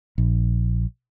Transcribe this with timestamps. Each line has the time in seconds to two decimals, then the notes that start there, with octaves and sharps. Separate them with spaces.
0.18 A#1